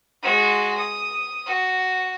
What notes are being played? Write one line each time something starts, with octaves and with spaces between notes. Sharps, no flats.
G#3 F#4
D#6
F#4